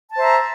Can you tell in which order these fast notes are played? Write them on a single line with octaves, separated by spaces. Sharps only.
A5 C5 E5 A#5